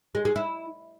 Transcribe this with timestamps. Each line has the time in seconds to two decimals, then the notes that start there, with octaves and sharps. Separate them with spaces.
0.15 G#3
0.25 G#3
0.36 E4